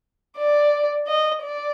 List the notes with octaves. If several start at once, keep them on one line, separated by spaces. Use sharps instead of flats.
D5
D#5
D5